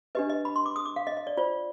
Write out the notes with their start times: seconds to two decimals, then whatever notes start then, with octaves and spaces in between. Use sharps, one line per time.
0.15 D4 G4 B4 D#5
0.30 D#5
0.45 B5
0.56 C6
0.66 D6
0.76 D#6
0.86 D6
0.96 F5
1.07 D#5
1.17 D#5
1.27 D5
1.37 F4 C5 D5